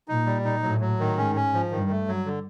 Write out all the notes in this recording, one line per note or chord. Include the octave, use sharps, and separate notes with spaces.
A#2 D#4
G3
D#4
A2 F#3
F#3
D#3
G#2 C#4
C#4
F3
G2 D#3
A3
F#3
D3